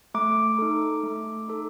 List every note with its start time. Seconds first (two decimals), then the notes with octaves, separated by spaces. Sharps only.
0.14 A3 D6
0.59 D#4 A4
1.03 A3
1.48 D#4 A4